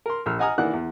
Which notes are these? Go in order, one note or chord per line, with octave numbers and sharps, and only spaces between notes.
A#4 C6
A#1 E6 F6
D#5 F#5 G#5 A#5 D#6 F6
D#3 E3 A#3 D5 F#5 F#6
E2